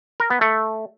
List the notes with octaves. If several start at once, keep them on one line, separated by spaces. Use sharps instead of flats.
A#4
B3
A3